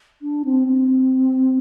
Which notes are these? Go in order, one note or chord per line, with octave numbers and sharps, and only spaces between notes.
D4
C4
C4